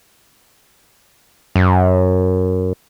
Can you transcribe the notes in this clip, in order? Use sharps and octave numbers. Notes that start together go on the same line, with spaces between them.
F#2